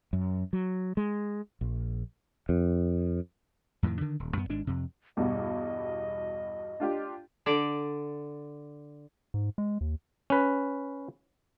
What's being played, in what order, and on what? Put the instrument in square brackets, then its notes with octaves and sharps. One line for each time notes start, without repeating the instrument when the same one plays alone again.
[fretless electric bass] F#2
F#3
G#3
A#1
F2
[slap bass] F2 A2 D3 D#3
D3 D#3
D#1
F#2 B3
G#1 G#2 G#3 D4
F2 C3
[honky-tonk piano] E2 G2 B2 [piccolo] D#5
[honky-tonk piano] D4 F4 G4
[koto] D3 D5
[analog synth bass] G#2
G#3
D#2
[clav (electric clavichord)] C#4 B4